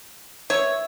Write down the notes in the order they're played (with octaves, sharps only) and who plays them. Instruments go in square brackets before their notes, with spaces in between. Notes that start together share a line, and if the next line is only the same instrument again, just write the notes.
[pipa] C#5 [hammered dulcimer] E5